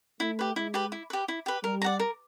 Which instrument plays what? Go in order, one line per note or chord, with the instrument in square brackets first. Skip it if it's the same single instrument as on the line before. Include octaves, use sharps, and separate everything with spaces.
[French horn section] A3 [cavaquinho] E4
[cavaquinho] G4 B4
[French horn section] G#3 [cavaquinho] E4
[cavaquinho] G4 B4
E4
G4 B4
E4
G4 B4
[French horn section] G3 [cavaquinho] A#4
[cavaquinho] A#5
D5 F#5
A#4